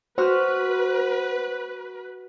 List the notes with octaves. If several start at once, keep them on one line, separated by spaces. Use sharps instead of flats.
F#4 B4 C5 F6